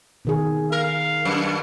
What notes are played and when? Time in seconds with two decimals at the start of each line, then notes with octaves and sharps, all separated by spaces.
0.25 B2 D#3 G#4
0.72 A#4 F5
1.25 F#2